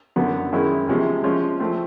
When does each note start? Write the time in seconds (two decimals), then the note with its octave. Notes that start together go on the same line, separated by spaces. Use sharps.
0.16 F#2 D3 F#3 B3
0.52 F#2 D#3 G#3 C#4 E4
0.87 E2 C3 F3 G#3 C#4
1.23 F3 G#3 C#4 F4
1.59 F3 A3 C4